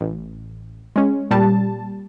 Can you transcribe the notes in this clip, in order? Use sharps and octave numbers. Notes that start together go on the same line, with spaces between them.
A1
G#3 C#4
A#2 G3 A5